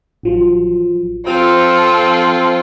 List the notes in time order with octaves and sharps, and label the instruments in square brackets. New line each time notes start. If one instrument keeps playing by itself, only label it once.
[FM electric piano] A1 F3 F#3
[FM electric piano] F3 F6 A6 [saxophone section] C4 [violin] F4 A4